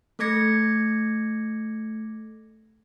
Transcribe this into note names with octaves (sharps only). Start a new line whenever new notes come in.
A3 A4 D6 G#6 A#6 C#7